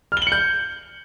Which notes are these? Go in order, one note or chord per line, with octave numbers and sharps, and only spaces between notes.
F6 G6 C#7 F#7 G7